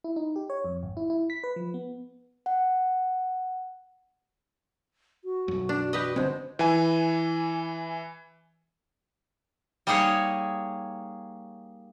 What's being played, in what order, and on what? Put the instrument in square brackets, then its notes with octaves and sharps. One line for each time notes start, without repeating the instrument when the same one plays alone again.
[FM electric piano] E4
D#4
G4
C#5
F2
G#1
E4
E4
B6
B4
F3
B3
[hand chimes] F#5
[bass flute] F#4
[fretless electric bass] B1 F#2
[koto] D4
G4 B4 D#5
[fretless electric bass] G1 D3 C4 [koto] B2 G#3 [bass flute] C5
[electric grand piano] E3 G#5
[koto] G3 A#3 D#4 G#4 C#5